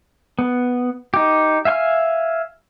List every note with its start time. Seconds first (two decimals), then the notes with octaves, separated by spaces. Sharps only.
0.39 B3
1.14 D#4 G4
1.65 E5 F5 G#5 C6 F6